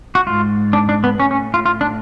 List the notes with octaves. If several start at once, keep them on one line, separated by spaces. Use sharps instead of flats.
F#4
G#2 F4
D4
D4
B3
A2 C#4
C#4
F4
F4
D4